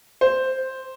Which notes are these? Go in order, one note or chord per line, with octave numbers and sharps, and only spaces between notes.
C5